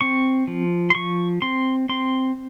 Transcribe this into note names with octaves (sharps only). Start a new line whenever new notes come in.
C4 C#6
F3
C6
F3 C#6
C4 C6
C4 C6